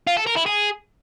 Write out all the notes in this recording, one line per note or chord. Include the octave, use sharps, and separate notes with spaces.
F4
A4
A#4
E4
G#4